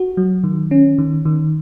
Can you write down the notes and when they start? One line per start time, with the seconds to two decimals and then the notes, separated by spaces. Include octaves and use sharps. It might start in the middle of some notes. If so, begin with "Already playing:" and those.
Already playing: F#4
0.17 F#3
0.44 D#3
0.71 C#4
0.98 D#3
1.25 D#3